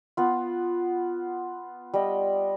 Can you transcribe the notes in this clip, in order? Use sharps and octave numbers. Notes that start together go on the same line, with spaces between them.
B3 F4
G3 D#5